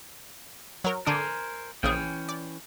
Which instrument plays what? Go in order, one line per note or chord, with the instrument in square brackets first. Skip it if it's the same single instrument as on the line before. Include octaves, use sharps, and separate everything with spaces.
[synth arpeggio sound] F#3 A#4
[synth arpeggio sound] D3 D4 D#6 [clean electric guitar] A#4 C5 G#5
[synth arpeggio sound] A#1 C#3 G#4 [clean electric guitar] E3 C#4 G5
[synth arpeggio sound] D5